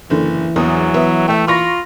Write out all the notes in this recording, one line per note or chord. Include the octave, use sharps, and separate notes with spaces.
F#1 D3 E3
A#1 E2 F#3 D#6
B3 E5
A3 E5 G5
F4 B5 C#6 A#6